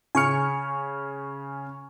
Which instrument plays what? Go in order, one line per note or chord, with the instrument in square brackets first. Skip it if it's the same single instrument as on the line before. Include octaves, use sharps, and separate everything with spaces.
[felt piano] C#3 C#7 [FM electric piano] G#5 C#6 F6